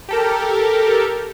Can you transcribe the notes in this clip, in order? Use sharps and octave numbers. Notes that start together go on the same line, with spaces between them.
G4 A4 A#4